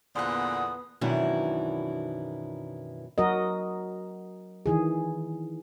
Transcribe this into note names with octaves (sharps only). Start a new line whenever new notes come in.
E2 A#2 D3 B3 C5 F#5 D#6
F#2 B2 D#3 E3 D4 E4
F#3 F#4 A#4 D#5
D#3 E3 G#4